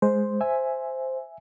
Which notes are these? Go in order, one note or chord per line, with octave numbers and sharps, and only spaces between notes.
G#3 C5
E5 G#5